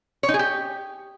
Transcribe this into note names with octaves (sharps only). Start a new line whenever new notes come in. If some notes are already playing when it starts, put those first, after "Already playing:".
C#5
D#4
G#4
G4